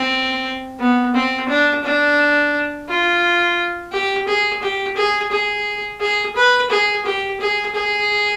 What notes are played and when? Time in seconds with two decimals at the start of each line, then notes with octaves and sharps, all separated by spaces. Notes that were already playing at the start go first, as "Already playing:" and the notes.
Already playing: C4
0.80 B3
1.14 C4
1.49 D4
1.84 D4
2.89 F4
3.92 G4
4.28 G#4
4.62 G4
4.97 G#4
5.32 G#4
6.00 G#4
6.36 B4
6.70 G#4
7.06 G4
7.40 G#4
7.75 G#4